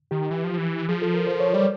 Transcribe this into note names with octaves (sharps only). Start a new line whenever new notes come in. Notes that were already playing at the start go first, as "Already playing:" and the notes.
D#3 G4
E3
F3
E3
F3 G#4
A4
A#4
C5
C#5
G3 D5